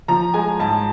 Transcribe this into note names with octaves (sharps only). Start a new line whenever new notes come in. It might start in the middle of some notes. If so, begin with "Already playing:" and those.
F3 A#5
G#3 G#5
G#2 A5